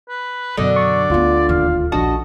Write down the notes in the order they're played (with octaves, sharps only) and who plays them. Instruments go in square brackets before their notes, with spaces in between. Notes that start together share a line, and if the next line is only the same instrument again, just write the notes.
[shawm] B4
[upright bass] F#2 B2 [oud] D3 [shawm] D#5
[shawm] D5 [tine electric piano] C#6
[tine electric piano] D2 F4 [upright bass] A3 B3
[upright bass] D#1 D#2 [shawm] F5
[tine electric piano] A#1 D4 A5 [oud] F#4 [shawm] D#5